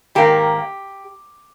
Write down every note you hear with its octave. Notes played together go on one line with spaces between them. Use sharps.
G#2 D#3 A#3 G4